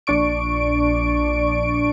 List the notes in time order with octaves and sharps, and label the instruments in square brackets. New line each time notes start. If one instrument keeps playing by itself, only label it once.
[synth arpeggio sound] A#1 D4 D5 C#6 D7